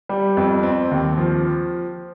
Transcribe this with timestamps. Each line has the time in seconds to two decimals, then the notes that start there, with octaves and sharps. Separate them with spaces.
0.09 G3
0.37 F2
0.63 C4
0.91 D#2
1.18 F3